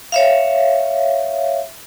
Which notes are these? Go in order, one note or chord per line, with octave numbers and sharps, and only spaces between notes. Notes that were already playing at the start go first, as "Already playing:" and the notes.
C#5 E5 F5